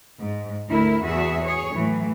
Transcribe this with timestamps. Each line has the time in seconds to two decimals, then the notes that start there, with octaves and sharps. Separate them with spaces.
0.19 G#2
0.69 D2 E4 A#4
1.04 E2 F#4 G#4 E5
1.44 G#4 C#5
1.75 A2 E3 F#3